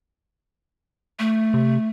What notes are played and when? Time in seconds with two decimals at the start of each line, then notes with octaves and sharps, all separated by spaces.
1.19 A3
1.54 C3